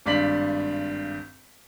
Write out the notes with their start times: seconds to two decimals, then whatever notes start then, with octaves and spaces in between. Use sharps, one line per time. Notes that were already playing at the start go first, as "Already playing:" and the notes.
0.06 G#1 G2 D5 F5 B6 F#7